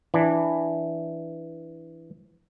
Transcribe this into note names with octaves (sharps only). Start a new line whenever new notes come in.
E3 D4